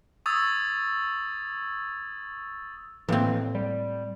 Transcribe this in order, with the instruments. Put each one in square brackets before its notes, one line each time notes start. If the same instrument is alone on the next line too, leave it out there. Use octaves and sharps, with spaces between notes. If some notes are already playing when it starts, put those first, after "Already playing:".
[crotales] C#6 D#6 E6 G#6 A6
[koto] A2 C4 [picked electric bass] E3 A#3
[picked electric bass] G3